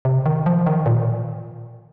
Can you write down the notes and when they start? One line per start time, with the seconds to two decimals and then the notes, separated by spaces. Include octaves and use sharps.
0.05 C3
0.26 D#3
0.46 F3
0.67 D#3
0.86 A#2